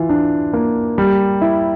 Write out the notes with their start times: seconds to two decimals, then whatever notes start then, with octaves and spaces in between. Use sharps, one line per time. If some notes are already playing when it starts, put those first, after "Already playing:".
Already playing: E3 F4
0.09 D4
0.53 A#3
0.98 G3
1.41 E4